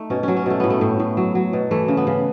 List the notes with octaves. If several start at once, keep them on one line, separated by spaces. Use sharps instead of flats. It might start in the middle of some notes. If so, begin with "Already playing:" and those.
Already playing: A3 D#4
B2 C#4
F#3 C#4
C#4
B2 A3
A2 B3
A3
A2
A2
F#3
F#3
B2
E3 A3
C#3
B3
C#3